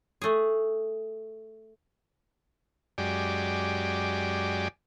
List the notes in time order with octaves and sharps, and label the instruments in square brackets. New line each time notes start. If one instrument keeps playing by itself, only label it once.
[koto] A3 G#4
[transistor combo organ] F#2 G#3 G4 D5